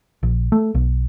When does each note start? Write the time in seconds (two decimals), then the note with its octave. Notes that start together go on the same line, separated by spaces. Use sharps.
0.23 A#1
0.52 A3
0.75 B1